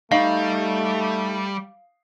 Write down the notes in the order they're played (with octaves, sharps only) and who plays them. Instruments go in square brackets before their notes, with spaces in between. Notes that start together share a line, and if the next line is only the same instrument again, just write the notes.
[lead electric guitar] G3 [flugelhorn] A3 [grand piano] D#4 C#6 C7 [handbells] F5